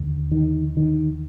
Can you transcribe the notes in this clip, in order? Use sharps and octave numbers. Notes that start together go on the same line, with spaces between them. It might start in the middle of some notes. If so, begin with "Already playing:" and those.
Already playing: D#2 D3
D#3
D#3